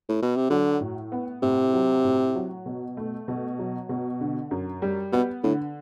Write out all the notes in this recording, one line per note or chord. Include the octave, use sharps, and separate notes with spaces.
A2
B2
C3
D3 F#3
A2
B3
A2 C3
F#3
A2
F#3
B2
A3
B2
F#3
B2
D3
F#2
G3
B2 B3
A2 D3